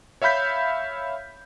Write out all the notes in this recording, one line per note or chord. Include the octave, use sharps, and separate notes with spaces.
C#5 E5 F5 B5 G6 B6